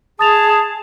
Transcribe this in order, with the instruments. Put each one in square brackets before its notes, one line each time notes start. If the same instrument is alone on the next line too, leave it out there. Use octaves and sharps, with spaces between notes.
[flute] G#4 [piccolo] A5 [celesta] D#6 A6 F7